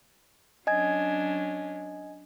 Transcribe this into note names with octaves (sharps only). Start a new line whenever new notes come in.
F#3 C#4 D4 D#5 G#5 G#6